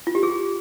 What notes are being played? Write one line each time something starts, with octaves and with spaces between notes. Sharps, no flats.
F4
G4
G#4